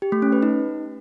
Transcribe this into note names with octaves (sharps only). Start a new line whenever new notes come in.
G4
A3
C#4
B4
D#4